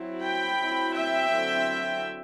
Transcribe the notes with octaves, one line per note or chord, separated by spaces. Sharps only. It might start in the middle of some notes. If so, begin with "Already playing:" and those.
Already playing: F#3 C4 E4
G5 B5
F#3 C4 E4
E5 G5
D3 F#3 C4 E4